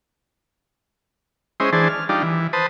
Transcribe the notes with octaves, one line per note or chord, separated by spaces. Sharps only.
G#3 C#4 E4 C5 D#5
E3 D4 G#4 C5 A5
F6
G3 D4 D#4 F4
E3
B4 C5 A5 D#6